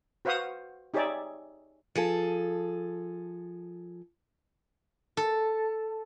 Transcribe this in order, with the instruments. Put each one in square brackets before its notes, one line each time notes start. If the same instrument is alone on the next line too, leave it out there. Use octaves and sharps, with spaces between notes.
[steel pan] F#4 B4 C5 F5 F#5 D#6
D#4 G4 G#4 C#5 D5 E5
[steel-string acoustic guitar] F3 G#4 A4
[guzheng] A4